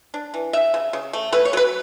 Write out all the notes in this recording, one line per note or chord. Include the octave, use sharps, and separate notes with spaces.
D4
E3
C#3 E5
C#3
C#3
A3
A3 B4
C#5
F#3 B4